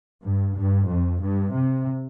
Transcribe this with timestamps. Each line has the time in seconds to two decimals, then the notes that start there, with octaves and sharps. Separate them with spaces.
0.23 G2
0.55 G2
0.87 F2
1.20 G2
1.52 C3